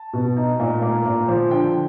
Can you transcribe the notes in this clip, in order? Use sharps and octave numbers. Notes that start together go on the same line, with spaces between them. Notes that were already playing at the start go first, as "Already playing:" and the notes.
Already playing: A5
B2
D#4
A#2
A#3
A#2
F3
D3 G5